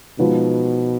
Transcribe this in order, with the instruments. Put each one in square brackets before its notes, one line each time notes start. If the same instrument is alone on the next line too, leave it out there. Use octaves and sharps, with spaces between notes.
[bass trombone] B2 [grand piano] F3 G#3 D#4 F#4 B4